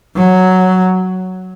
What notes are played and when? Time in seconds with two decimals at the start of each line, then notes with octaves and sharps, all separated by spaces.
0.16 F#3